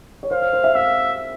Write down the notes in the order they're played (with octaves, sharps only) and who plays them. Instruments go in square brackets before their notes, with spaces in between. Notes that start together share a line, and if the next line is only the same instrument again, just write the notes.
[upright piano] C#5
[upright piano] C5 [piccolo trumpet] F5
[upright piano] C5
C5
E5
[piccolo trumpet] E5 [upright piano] F5